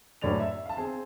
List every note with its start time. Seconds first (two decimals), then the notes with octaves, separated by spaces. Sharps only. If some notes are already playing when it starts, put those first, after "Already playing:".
0.22 F#1 D2 A2 C#5 D5 F7
0.40 E5
0.66 F5 A5
0.77 C4 G#4